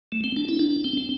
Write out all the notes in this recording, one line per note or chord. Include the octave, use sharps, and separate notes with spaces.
A3
C4
D4
E4
D4
C4
C4